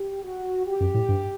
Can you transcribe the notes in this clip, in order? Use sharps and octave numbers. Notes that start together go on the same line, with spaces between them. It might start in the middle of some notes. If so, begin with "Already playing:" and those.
Already playing: G4
F#4
G4
F#2
A2
G2